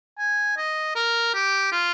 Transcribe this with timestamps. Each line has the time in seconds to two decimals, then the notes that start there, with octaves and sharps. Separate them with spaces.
0.18 G#5
0.57 D#5
0.95 A#4
1.34 G4
1.72 F4